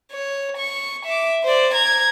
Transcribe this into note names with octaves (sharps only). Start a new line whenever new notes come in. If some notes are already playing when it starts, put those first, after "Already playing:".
C#5
C#6
E5 D6
C5 D5
A#5 G#6